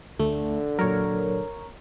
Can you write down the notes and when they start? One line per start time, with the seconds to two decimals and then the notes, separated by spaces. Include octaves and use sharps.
0.20 D2 D3 A3
0.79 A#2 F#3 A#4 C#5